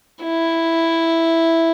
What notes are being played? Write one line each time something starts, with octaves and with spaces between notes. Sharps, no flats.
E4